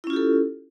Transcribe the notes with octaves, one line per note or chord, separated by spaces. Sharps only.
C#4 E4 F4 G4 A4